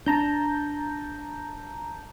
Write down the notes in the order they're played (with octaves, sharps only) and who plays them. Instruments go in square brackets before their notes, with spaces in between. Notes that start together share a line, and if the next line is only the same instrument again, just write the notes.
[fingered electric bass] D4 [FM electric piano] A5 A#5 G6